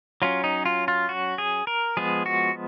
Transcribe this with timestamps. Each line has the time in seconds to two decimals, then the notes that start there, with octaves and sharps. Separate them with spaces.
0.22 F#3 C#4 F4
0.44 D#4
0.66 F4
0.88 F4
1.09 F#4
1.38 G#4
1.67 A#4
1.97 F3 G#3 B3 G#4
2.26 F#4